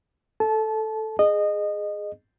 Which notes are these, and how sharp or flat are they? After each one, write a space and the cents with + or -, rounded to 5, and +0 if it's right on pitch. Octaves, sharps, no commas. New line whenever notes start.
A4 +0 A5 -25
G#4 +0 D#5 -20